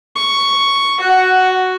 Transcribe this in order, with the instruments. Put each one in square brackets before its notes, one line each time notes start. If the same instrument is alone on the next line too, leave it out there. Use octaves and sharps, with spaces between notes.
[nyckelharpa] C#6
[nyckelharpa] F#4 [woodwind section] F#5